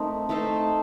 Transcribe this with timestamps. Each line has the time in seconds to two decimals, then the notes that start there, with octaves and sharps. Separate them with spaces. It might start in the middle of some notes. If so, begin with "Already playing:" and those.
Already playing: A3 C4 D#4 A#4
0.29 A3 D#4 A4 C5